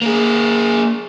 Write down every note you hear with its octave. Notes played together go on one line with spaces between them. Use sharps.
A#3 G#4